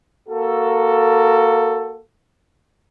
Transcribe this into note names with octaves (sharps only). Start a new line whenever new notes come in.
A#3 F#4 A4